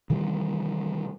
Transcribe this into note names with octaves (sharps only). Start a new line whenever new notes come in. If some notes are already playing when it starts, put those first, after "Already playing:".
C3 D#3 E3 G3